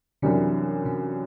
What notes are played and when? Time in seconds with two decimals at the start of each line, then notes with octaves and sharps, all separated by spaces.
0.22 F#2 C3 E3 G3 D4
0.85 C3